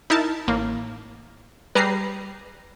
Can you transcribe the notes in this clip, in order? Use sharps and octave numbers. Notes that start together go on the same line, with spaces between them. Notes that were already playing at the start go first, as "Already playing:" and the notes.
D#4 E4 A#4 A5
A1 A2 A#3
G3 G#4 B4 A#5 C7